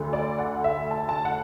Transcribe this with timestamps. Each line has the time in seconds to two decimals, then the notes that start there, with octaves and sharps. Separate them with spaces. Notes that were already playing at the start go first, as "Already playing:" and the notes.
Already playing: D2 D3 A3
0.13 D5
0.39 F#5
0.64 E5
0.91 A5
1.09 A5
1.25 F#5